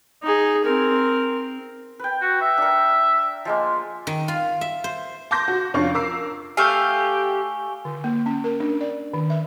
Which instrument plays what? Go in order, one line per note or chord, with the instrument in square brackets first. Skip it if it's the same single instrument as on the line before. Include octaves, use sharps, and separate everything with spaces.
[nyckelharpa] D#4 G#4
C4 A#4
[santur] B4 G5
[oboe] F#4
E5
[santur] D4 A#4
F3 G#3 A#3
[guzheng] D#3
F4
E5
C5
[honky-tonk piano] A5 C6 D6 G6 A#6
F#4
F2 C#4 D4 F4 F5 C#6
A#4 D6 E6 C7
[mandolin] A3 F5 [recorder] G4 [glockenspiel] G#5 C#6 G7
[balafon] D3
A#3
C#4
A#4
D4
D5
D#3
E5